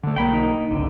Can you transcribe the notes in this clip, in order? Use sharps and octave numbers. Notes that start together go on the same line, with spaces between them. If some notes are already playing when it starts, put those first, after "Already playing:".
D3 A3
B1 A#3 G5 B5
D#4
G#1 C#2 D3